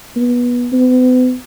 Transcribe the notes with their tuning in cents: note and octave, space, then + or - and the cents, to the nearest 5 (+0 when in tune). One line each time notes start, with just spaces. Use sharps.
B3 -20
B3 +40